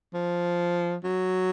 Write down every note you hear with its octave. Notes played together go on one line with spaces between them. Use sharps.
F3
F#3